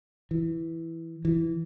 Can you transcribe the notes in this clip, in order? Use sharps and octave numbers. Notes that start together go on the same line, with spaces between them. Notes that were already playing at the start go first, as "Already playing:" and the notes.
E3
E3